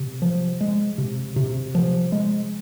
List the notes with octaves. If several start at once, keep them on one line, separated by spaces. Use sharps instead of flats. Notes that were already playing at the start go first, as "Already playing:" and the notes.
Already playing: C3
F3
G#3
C3
C3
F3
G#3